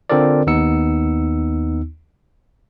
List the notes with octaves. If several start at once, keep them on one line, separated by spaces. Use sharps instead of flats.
D3 C4 F4 A4 A#4 D5
D#2 B3 D#4 E6 C#7